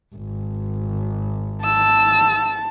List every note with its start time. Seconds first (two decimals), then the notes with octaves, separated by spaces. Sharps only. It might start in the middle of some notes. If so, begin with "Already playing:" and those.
0.15 G#1
1.65 A5 E6